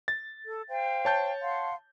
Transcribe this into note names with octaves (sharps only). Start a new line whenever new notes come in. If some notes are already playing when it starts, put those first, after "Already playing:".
A6
A4
C5 F5 G5
C#5 A5 G6
F5 F#5 C6